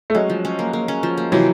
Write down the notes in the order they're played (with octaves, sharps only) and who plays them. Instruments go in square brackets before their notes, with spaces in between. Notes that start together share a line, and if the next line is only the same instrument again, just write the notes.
[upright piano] A3
[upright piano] F#3 G#3 [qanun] C#4
[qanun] F3
C#4
A#3
A#3
C#4
F3
A#3
[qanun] C3 [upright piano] E3 F#3